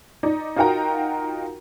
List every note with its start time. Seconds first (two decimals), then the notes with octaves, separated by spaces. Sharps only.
0.23 D#4 D5
0.56 D#4 F4 F#4 A#4 G5 A#5